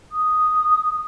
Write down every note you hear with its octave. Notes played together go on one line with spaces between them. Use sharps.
D#6